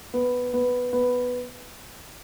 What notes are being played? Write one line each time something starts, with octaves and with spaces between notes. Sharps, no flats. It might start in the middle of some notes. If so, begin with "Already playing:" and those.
B3
B3
B3